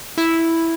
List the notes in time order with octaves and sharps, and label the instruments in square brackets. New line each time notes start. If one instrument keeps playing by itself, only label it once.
[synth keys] E4